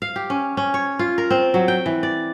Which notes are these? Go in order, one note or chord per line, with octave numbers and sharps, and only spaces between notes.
F5
G4
C#4
C#4
C#5
F4
A#4
C4
F#3
G5
E3
D5